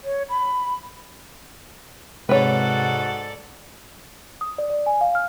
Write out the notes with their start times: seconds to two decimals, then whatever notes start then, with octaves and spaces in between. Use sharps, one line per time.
0.04 C#5
0.29 B5
2.29 G#2 C3 G#3 F#4 A4 B4 C#5 D5
4.41 D#6
4.58 D5
4.70 D5
4.86 G#5
5.01 F5
5.15 F6